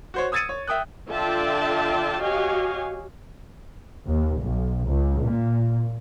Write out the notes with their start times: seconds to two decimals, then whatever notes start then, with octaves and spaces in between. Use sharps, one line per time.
0.14 F#4 C5 C#5
0.32 D#6 E6 G#6 A6 C#7 D#7
0.49 C#5
0.67 E5 G5 D#6 F#6
1.11 D3 F4 D5 E5 G5 A5
2.22 F#4 G4 C#5 D#5 F5 G#5
4.07 D#2
4.41 B1
4.88 C#2
5.22 A#2